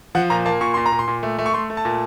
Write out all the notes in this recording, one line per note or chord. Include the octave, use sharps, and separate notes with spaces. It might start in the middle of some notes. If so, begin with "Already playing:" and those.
F3 F#5
A#2 A#5
A#3 A5
A#2 C#6
A#2 C6
A#5
A#2
C6
A#2
A3
A3
C#6
A3 C6
A3
A5
A#2